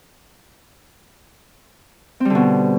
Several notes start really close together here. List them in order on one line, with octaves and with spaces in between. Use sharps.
C4 G3 D3 B2